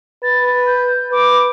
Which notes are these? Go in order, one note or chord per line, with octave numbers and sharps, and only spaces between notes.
B4 A6
G6
B4 D6